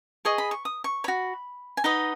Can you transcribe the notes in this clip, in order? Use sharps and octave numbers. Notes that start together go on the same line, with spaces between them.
G#4 D#5 C#6
B5
C#6
D#6
C#6
F#4 C#5 B5
G#5
D#4 B4 D#5 F#5